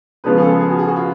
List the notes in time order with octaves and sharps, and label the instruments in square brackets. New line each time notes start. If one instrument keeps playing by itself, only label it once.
[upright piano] C#2 C#3 F3 B3 F4 [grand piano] B4
[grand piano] G#4
A4
A4
G#4
F#4
G#4
F#4
F4